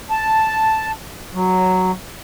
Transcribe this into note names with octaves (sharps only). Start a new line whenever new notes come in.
A5
F#3